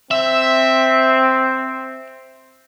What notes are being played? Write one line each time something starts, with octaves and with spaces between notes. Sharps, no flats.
C4 E5